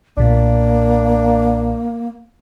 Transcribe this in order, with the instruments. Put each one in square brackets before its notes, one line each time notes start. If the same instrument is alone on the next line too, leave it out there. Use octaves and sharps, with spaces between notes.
[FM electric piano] B1 A#2 [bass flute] A#3 [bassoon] D4